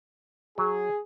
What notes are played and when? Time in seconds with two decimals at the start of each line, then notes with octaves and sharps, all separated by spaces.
0.58 F#3 G#4